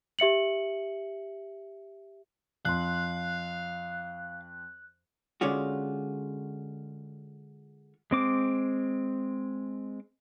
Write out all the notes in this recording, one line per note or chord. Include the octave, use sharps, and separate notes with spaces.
G4 E5 C#7 F#7
F2 F5 C6 F#6
D3 G#3 C#4 F4 F#4
G#3 C4 D6